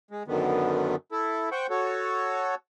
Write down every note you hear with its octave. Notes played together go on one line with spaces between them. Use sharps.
G#3
F#2 D3 D#3 B3
E4 A4
C5 F#5 G5 C#6
F#4 A4 C#5